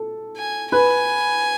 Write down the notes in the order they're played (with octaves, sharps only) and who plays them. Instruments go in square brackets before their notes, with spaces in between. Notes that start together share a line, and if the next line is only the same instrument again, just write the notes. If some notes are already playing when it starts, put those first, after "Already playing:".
Already playing: [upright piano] A4
[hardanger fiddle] G#5
[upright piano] B4 [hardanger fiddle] G#5